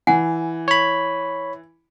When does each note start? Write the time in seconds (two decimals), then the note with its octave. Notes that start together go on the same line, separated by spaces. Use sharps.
0.07 E3 F#5 G#5
0.68 C#5 B5